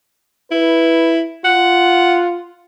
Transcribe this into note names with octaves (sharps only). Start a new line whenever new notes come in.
E4 B4
F4 F#5